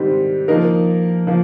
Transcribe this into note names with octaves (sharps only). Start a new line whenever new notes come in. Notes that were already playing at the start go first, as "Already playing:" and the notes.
Already playing: G#2 D#3 G3 C4
F3 A#3 D#4 A#4
F3 A#3